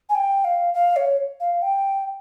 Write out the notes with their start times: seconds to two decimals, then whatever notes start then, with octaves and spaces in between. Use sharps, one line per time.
0.09 G#5
0.15 G5
0.44 F5
0.74 F5
0.96 C#5
1.40 F5
1.62 G5